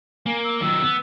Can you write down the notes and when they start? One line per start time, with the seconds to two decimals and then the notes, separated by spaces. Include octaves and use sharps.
0.26 A#3 G#5
0.44 E6
0.61 D#3 F#3 E6
0.82 B3